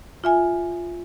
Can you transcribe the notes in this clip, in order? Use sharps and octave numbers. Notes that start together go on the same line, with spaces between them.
F4 E5 G#5